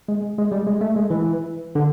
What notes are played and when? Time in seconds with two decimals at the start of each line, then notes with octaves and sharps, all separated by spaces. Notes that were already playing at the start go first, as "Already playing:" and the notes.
0.08 G#3
0.38 G#3
0.52 G3
0.67 G#3
0.81 A3
0.96 G#3
1.10 E3
1.75 D3